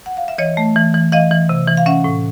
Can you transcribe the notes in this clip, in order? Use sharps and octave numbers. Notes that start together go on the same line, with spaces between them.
F#5
F5
E5
E3 C#5 D#5
A3
E3
E3
E3 D#5 F5
E3
C3
E3
F5
C#4 E5 F#5
A2